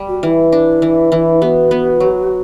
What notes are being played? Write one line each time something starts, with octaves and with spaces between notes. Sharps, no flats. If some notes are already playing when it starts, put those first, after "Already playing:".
Already playing: G3
F#4
E3 E4 F#4
D4
E3
E3
B3 F#4 G4
B3
F#3